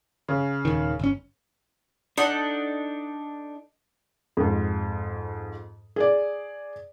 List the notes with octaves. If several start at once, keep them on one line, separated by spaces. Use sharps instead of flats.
C#3
D#1 D#3
G1 C#4
D4 D#4 A4 F#5
F2 G#2
G#4 D5